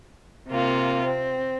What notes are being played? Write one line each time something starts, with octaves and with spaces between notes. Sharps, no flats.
C3 A#3 F4
C4